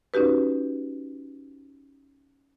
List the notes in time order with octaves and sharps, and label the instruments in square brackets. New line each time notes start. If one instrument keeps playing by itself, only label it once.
[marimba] C#4 D#4 F#4 G4 B4